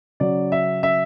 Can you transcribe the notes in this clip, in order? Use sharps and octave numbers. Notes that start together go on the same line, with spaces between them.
C#3 F#3 D5
E5
E5